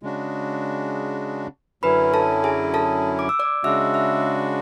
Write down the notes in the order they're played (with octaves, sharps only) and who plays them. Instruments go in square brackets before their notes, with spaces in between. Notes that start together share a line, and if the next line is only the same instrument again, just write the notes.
[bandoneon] C#3 G#3 D4 F#4
[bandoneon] F#2 D3 F#3 C#4 E4 [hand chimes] B4 B5
[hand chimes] A4 A5
G#4 G#5
A4 A5
D6
E6
D5 D6
[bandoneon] C#3 G#3 D4 F#4 [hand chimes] E5 E6
[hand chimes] E5 E6